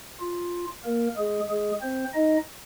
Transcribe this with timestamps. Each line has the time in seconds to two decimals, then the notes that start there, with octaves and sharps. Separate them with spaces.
0.20 F4
0.84 A#3 A#4
1.17 G#3 G#4
1.48 G#3 G#4
1.81 C4 C5
2.14 D#4 D#5